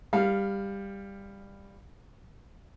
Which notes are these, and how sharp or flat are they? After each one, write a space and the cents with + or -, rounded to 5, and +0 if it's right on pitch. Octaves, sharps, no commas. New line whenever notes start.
G3 +15 F5 +0